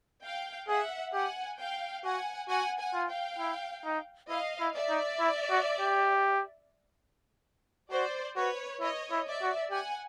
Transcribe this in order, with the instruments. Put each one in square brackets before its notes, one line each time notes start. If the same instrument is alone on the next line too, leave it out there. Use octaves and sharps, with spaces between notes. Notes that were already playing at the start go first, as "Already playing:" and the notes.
[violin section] F5 G5
[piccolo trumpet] G#4 [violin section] E5 F#5
[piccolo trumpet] G4 [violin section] F#5 G#5
[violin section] F5 G5
[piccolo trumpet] F#4 [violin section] F#5 G#5
[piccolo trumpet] F#4 [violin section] F#5 G#5
[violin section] F#5 G#5
[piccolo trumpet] F4
[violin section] F5 G5
[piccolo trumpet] E4
D#4
[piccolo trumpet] E4 [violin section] D#5 F5
[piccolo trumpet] E4
[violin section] D5 E5
[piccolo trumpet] D#4
E4
F#4
G4
[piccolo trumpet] F#4 [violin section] C5 D5
[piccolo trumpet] F#4 [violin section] B4 C#5
[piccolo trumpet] E4 [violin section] C#5 D#5
[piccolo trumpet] E4
[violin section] D5 E5
[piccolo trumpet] F#4
[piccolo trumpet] G4 [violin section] F#5 G#5